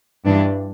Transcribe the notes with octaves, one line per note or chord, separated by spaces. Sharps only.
G2 E3 G3 D4